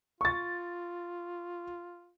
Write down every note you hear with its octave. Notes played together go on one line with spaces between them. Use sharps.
F4 C#6 A6